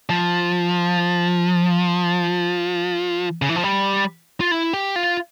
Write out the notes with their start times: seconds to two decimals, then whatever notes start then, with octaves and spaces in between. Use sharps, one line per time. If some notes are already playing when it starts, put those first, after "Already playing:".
0.09 F3
3.42 C#3
3.49 E3
3.56 F3
3.64 G3
4.40 F4
4.51 E4
4.73 G4
4.96 F4